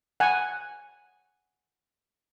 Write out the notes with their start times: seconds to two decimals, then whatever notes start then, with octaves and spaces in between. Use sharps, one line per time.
0.20 F#5 G#5